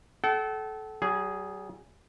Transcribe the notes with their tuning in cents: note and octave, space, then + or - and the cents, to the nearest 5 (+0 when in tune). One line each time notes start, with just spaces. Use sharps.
A4 -25 F#5 +45
G3 -45 G#4 +0